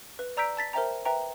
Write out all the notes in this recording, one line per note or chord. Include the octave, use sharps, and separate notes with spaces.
B4
D5 A#5 E6 G6 B6 D7
A5 A6 B6
A#4 C5 E5 G5 A#5
B4 E5 G5 A#5